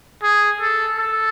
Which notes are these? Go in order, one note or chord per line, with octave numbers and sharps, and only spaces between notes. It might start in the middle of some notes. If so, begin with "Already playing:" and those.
G#4
A4
A4